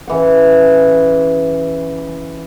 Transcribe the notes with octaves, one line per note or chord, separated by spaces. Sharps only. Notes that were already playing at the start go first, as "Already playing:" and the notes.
C#3 E3 F#5